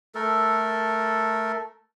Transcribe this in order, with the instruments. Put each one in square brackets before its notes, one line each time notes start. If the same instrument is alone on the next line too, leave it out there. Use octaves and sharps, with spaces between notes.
[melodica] A3 A4 A#4